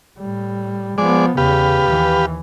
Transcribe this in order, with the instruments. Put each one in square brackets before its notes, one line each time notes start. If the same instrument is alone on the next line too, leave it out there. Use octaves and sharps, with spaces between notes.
[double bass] A2 G3
[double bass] F3 B3 [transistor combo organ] G#3 D5
[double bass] E2 C#3 [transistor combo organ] G4 B4 F5
[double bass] D#2 E3